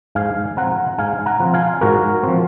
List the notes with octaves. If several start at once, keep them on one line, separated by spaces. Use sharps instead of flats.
G#2 F5 G#5
F3 C4 F#5 A#5
G#2 F5 G#5
F#5 A#5
F3 C4
F5 G#5
G#2 F#4 A#4
F3 C4